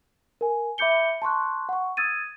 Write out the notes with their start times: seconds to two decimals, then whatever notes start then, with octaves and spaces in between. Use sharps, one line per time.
0.41 A#4 G#5
0.78 E5 B5 D6 G6 C#7 G7
1.22 A5 C6 C#6 F#6
1.69 F#5 C#6
1.97 D#6 E6 G#6 A6 D#7